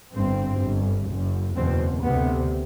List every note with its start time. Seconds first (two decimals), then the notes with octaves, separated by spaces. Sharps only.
0.14 G1 G2 C4
0.61 G1 G2
1.09 F#1 F#2
1.56 F#1 E2 B2 C4
2.04 D2 C3 B3